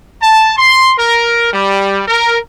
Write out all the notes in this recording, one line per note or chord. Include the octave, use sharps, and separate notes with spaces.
A5
C6
A#4
G3
A#4